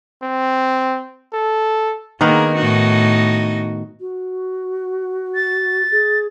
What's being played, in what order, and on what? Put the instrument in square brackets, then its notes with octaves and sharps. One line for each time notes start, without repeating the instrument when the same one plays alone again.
[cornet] C4
A4
[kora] D#3 B3 A#4 [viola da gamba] A#3 G#4
[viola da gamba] A2 D#4 F#4
[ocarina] F#4
[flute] A6
[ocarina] G#4